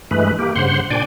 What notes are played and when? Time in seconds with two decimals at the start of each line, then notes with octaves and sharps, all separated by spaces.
0.11 G2 E3 G#3 A3 B4
0.39 A#3 G4
0.56 G2 C#3 C5 F#5 C6
0.90 A#2 D4 D5 G5 G#5